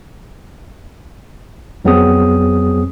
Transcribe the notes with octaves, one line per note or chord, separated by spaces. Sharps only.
F2 F#3 B3 C4 G#4 D#6